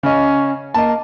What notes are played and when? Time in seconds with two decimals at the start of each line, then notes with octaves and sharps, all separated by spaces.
0.03 C#3 C#4 D#5
0.74 A#3 D#5 A5